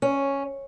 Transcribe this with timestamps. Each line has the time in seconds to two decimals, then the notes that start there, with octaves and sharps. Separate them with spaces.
0.02 C#4